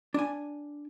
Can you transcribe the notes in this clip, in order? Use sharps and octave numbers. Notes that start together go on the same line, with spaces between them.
D4 G#5